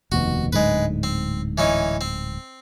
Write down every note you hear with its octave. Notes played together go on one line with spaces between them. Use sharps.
F1 D#2 B2 F#4
D1 G#2 D3 G#3 B4
C4
E3 C#4 D#4
C4